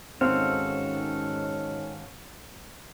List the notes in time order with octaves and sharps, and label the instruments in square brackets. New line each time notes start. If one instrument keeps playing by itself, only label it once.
[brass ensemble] G#2 D#3 C#4 [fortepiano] C4 [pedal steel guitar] F#4 A4 F5